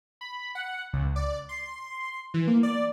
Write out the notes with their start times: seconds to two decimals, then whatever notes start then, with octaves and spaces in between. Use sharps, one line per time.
0.21 B5
0.55 F#5
0.93 C#2
1.16 D5
1.49 C6
2.34 E3
2.47 A#3
2.63 D5